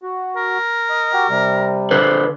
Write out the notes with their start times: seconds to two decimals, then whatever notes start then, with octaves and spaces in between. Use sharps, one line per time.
0.03 F#4
0.36 A#4
0.89 D#5
1.13 F#4 G4
1.30 C3 G3
1.91 D3 B4 C5